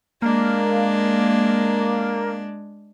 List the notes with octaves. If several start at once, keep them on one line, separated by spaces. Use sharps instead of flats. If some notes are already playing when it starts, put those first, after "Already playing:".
G#3 A#3 D4